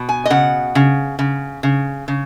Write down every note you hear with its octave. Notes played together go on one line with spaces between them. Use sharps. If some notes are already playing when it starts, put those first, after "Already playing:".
Already playing: B2
G#5
D#5
C#3 F#5
C#3
C#3
C#3
C#3